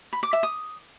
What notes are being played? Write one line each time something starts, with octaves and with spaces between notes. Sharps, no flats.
B5
D6
E5
D#6